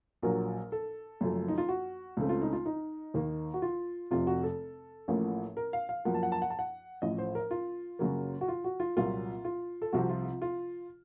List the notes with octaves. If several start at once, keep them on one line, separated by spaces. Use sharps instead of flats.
A#1 A#2 F#3 A#3 A#4
A4
F#1 F#2 F3 A3
D#4
F4
F#4
C#2 C#3 A3 C4
F4
D#4
F4
D#4
D#2 D#3 A#3
F#4
F4
F1 F2 C3 F4
F#4
A4
A1 A2 F3 A#3
A#4
F5
F5
F#2 F3 A#3 F#5
A5
F#5
A5
F#5
A5
F#5
A1 A2 F3 D#5
C5
A#4
F4
F#2 C#3 F#3 A#3
F#4
F4
F#4
F4
C2 A#2 F#3 A#3 F4
F4
A4
C2 C3 F3 C4 F#4
F4
F4
F4